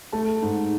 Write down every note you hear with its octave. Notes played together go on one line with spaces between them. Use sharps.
A3 A5
G#2